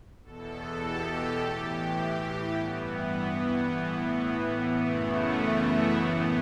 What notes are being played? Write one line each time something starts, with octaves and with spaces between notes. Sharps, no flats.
E2 B2 A4
G4
A2 E3 G4
G4
G2 E3 B3
A2 E3
F#2 C#3 E3 A3
A3
A2 E3 B3